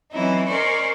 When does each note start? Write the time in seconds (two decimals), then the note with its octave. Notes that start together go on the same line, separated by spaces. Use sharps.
0.12 E3 F#3 C4 C#4 D#4 E4
0.48 C#4 A#4 C5 D5 D#5 C#6